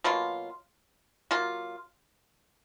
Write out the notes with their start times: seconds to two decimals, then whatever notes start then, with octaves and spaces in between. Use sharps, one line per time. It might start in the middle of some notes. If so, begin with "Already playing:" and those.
0.04 B2 F#3 A#3 F4
1.31 F#3 A#3 F4